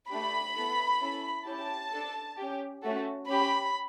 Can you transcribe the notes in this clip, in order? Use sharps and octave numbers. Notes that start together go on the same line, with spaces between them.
A3 D4 G4 B5
B3 E4 A4
C#4 E4 A4
C#4 E4 G4 A5
D4 A4
C#4 G4
A3 C#4 F#4 A4
C#4 G4 B5